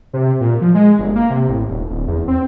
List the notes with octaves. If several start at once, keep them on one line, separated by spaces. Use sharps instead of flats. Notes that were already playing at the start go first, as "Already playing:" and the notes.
C3
A#2
F3
G#3
G1
A#3
C3
A1
D#1
D1
E2
C4